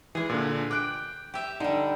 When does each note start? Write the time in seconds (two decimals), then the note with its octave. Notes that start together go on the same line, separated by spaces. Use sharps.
0.15 E3 G#3 G#4
0.30 A#2 D3
0.71 G5 D6 F#6 D7
1.34 G4 E5
1.60 D3 G3 D#4